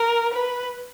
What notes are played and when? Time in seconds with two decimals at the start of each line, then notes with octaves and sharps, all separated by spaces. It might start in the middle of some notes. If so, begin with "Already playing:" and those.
Already playing: A#4
0.34 B4